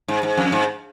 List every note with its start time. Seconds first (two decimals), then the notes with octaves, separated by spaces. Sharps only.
0.08 G#2
0.23 G#2
0.37 F2
0.52 G#2